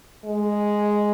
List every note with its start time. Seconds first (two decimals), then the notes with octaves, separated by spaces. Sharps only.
0.25 G#3